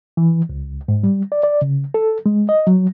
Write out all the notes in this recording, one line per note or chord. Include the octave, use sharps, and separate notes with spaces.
E3
C#2
G#2
G3
D5
D5
C#3
A4
G#3
D#5
F#3